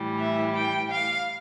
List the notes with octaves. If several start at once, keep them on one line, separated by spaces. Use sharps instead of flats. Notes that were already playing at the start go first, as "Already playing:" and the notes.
Already playing: A2 E3 G3
E5
G5
F5